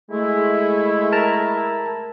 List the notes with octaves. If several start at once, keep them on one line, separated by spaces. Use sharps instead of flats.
G#3 A3 E4
A#4 A5 A#5